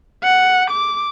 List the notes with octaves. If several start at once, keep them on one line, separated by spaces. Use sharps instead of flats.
F#5
D6